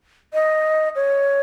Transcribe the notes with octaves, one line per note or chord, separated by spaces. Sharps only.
D#5
C#5